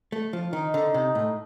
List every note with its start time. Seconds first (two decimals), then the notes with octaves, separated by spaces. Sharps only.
0.12 A3
0.33 F3
0.53 D#3 D#4
0.74 D3
0.94 C3
1.15 A2